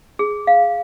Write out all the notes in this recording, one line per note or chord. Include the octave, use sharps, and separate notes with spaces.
G#4
F5